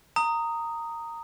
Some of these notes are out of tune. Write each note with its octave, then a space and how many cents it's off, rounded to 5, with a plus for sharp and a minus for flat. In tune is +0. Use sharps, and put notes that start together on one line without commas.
A#5 -15 D#6 +0